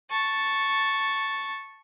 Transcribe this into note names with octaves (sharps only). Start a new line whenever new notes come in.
A5 C#6